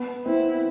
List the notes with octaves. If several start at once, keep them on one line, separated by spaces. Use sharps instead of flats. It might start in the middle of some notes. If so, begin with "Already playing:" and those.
Already playing: B3
C4 E4